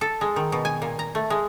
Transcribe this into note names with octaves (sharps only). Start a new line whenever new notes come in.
A4
G#3
D#3
B2
G#5
A#2
A#5
A3
G#3